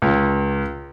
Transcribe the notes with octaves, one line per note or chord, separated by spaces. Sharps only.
C#2